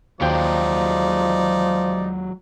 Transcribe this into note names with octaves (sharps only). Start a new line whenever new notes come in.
D#2 F3 F#3 G#3 D#4 D5 G5